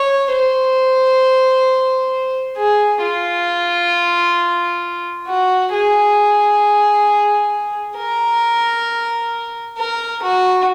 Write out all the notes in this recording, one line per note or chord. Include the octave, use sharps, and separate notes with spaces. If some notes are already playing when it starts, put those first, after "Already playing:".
Already playing: C#5
C5
G#4
F4
F#4
G#4
A#4
A#4
F#4